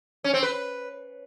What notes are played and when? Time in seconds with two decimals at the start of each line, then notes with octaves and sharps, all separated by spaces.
0.24 C#4
0.33 C4
0.43 B4